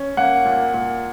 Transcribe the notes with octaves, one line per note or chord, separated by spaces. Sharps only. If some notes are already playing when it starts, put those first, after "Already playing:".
Already playing: C#4
A#3 F#5
A#2
A#2